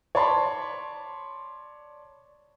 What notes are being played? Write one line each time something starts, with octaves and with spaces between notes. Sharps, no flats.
C#5 D5 A5 B5 C6